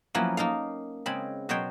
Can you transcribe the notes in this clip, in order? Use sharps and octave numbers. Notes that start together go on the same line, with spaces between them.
F3 F#3 A#3 B3 C#4 E4
A#3 D#4 A4 F5
C#3 G#3 C4 B5
B2 F#3 C5 C#5 G5